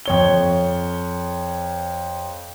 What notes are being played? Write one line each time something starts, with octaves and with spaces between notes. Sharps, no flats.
F2 C#5 G7